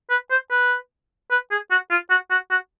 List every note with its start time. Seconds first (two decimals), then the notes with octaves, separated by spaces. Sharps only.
0.10 B4
0.30 C5
0.51 B4
1.31 B4
1.51 G#4
1.71 F#4
1.90 F4
2.10 F#4
2.30 F#4
2.50 F#4